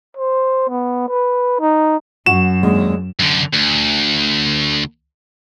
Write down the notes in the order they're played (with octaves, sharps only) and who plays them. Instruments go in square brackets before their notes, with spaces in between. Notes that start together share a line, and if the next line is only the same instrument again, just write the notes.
[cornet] C5
B3
B4
D#4
[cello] F#2 [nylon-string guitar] F#4 [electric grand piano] E7
[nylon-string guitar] D#2 G#3 D4
[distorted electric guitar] F#2 D3
D2